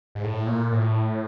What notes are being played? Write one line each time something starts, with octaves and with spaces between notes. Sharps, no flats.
G#2
A2
A#2
A2